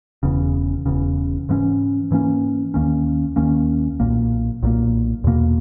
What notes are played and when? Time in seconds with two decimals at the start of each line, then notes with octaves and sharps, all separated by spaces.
0.23 E1 E2 C#3
0.86 E1 E2 C#3
1.49 G#2 E3 A#3 C#4
2.11 G#2 E3 A#3 C#4
2.74 D#2 D#3 A#3 C#4
3.36 D#2 D#3 A#3 C#4
4.00 B1 A#2 A#3
4.63 B1 A#2 A#3
5.24 E2 B2 A#3